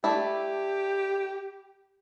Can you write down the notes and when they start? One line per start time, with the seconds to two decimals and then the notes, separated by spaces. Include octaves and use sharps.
0.04 A3 D4 E4 G4